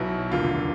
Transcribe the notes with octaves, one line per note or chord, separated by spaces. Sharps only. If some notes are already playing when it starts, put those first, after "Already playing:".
Already playing: B1 B2 F#3 E4
F1 D#2 D3 F4